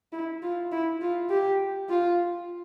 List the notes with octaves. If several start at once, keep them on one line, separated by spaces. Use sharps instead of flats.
E4
F4
E4
F4
G4
F4